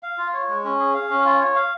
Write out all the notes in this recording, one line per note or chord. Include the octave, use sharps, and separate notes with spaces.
F5
F4
C#5
G#3
C#4
G#4
F5
C#4
F4
C#5
F5